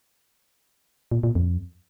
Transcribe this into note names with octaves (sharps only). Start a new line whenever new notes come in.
A#2
A#2
F2